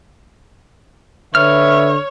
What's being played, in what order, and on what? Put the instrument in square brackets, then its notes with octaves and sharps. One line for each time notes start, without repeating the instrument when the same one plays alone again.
[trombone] D3 [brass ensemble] B4 E5 [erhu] C#5 [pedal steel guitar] F6